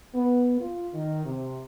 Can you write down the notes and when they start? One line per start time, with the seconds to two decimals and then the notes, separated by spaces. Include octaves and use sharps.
0.14 B3
0.60 F4
0.94 D#3
1.26 C3